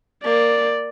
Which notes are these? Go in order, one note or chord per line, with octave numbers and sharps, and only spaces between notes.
A#3 D5